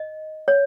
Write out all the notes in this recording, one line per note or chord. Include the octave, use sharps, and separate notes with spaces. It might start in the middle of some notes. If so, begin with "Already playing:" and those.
Already playing: D#5
C#5